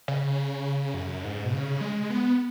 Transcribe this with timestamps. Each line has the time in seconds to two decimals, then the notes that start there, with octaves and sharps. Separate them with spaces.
0.08 C#3
0.94 F#2
1.24 G#2
1.45 B2
1.53 C#3
1.81 G#3
2.10 B3